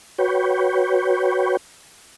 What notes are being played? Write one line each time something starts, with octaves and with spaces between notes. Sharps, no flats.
F#4 B4 C#5 G5